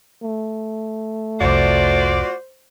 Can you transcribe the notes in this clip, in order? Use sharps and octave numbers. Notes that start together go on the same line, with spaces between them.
A3
F1 C2 F4 F#4 C5 D5